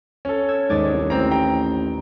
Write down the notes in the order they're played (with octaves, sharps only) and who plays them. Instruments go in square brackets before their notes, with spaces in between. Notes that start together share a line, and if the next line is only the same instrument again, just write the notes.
[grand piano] C#4 A4
[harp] E6 G#6
[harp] D#2 D5 G#6 [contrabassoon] G#2
[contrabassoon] C2
[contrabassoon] A1 [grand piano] C4 A#5
[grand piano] G5 A#5